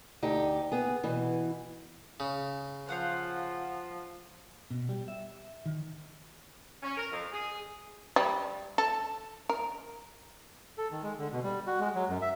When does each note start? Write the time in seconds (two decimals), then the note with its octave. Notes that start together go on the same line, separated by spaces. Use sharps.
0.22 D2 D#4 G4
0.72 B3 G#4
1.03 B2 E3
2.20 C#3
2.89 F3 C5 F5 F#5
4.71 B2
4.89 G3
5.08 E5
5.66 D#3
6.83 C#4
6.97 A#4
7.11 F2
7.32 G#4
8.16 G3
8.78 A4
9.49 A#4
10.78 A4
10.92 D#3
11.03 G#3
11.19 D3
11.32 B2
11.44 G3
11.67 F#4
11.80 G#3
11.95 F#3
12.09 F#2
12.22 E5